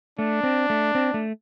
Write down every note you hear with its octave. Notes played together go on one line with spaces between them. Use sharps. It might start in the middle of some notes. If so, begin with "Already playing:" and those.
A3 D4
C4
A3
C4
A3